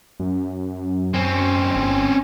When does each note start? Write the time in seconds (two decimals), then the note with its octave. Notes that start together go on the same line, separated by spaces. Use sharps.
0.20 F#2
1.14 C4 C#4
1.76 G1